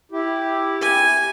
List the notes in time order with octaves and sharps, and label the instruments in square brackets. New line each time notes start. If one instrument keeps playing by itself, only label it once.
[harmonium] E4 G4
[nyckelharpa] G#5